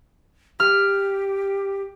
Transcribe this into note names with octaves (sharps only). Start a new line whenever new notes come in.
G4 F6